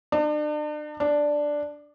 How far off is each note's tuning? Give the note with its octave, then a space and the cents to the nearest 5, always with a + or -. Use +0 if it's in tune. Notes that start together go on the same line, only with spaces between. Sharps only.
D4 +40
D4 +0